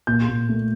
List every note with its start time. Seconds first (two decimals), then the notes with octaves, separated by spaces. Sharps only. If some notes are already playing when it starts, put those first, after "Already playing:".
0.07 A#2 G6
0.29 A#2
0.49 A3